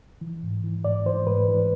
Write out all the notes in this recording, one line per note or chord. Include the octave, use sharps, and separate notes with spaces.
E3
G#2
E3
G#2 D5
E3 C5
G#2 B4
E3